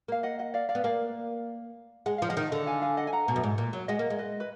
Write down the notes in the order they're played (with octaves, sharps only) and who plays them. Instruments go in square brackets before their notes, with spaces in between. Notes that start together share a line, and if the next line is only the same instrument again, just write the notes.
[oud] A#3 [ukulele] F5
[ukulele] D#5 F#5
D#5 F#5
D5 F5
D5 F5
[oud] B3
[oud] A#3 [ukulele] D5 F5
[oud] G#3 [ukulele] F#5
[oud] F3 [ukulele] F5
[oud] F3 [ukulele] D#5 F#5
[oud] D#3
D3
[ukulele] F5 G#5
F5 G#5
D#5 F#5
G#5
F#5 A#5
[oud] B2
F#2
G#2
A#2
F#3
[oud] G#3 [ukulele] D#5 F#5
[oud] A#3
G#3
[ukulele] B4 D#5
B4